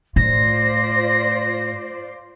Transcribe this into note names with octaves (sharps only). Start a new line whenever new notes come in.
A2 F4 C5 D5 A#6